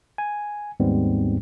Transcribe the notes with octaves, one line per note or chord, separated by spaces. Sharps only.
G#5
D#2 G#2 G3 B3 C4